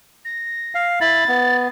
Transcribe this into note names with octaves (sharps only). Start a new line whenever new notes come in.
A#6
F5
E4 B5 A6
B3